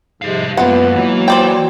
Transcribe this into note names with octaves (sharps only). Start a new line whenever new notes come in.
G#2 C3 F3 G3 G#3 F5
F#2 G#3 A#3 B3 F4 F#5
E3 F#3
C5 D5 G5